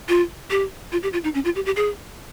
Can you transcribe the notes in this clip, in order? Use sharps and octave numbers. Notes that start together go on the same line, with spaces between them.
F4
G4
F4
G4
F4
D#4
C#4
F4
G4
G4
G#4